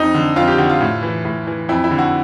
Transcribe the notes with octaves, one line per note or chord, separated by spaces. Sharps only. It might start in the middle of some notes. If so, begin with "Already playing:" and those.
Already playing: F2 D#4
D3
F2 F4
G4
D3 F#4
F4
A2
E3
A2
E3
F2 E4
E4
D3
F#4